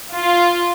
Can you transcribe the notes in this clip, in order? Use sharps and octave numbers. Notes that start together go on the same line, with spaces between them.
F4